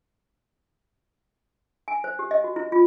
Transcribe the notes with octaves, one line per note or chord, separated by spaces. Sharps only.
G#5
C5
G4
D#5
F#4
E4
F4